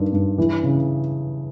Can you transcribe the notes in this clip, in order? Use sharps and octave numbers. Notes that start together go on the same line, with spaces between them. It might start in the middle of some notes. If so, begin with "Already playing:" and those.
Already playing: G2 D#3
G2
E3
C#3